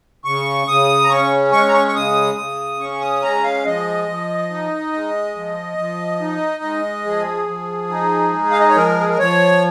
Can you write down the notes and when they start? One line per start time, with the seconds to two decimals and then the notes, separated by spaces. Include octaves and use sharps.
0.24 C#3 C#6
0.67 C#3 D#6
1.04 A#5
1.10 C#4 C#6
1.52 G#3 C#6
1.68 A#5
1.73 C#6
1.88 C#6
1.95 C#3 D#6
2.38 C#3
2.80 C#4 C#6
3.01 D#6
3.22 G#3 A#5
3.44 F5
3.65 F3 D#5
4.08 F3
4.50 D#4
4.93 G#3
5.36 F3
5.77 F3
6.21 D#4
6.63 G#3
7.05 F3 G#4
7.48 F3
7.91 D#4
8.33 G#3
8.51 F5
8.60 D#5
8.68 C#5
8.75 F3 A#4
9.00 G#4
9.09 A#4
9.18 F3 C#5